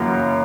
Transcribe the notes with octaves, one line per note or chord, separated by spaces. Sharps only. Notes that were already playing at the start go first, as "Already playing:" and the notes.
Already playing: F#2 C#3 E3 A#3